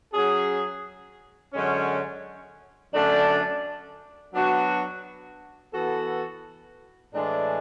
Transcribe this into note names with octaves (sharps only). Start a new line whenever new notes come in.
F#3 C#4 G#4
F#2 D3 G#3 C#4
F#2 D3 A3 D4
F#3 B3 D4 F#4
E3 B3 F#4 A4
A2 E3 G#3 D4